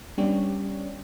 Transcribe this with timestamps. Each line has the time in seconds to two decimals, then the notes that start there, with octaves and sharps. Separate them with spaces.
0.17 G3 B3 C#4 D4 G4 C#5